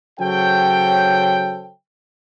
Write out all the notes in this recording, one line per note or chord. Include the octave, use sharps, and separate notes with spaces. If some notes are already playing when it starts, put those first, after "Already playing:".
C#3 F#3 A4 C5 C#5 G5